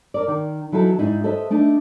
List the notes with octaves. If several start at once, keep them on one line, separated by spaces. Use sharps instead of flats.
A#4 D5
D#3
E3 F#3 D#4 E4 A4
G#2 D#4 E4
A4 B4 C5 D#5 E5
A3 D4 D#4